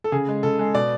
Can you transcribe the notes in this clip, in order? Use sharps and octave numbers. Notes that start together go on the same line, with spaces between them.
A4
C#3 G#4
G#3
C#3 A4
G#3
B2 D5